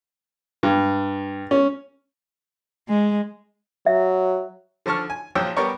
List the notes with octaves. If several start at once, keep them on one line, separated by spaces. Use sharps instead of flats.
G2
C#4
G#3
F#3 E5
D3 F3 A5 C#6 F6
G#5
A#1 F3 F#3 G5 E6
G3 B3 A#4 C#5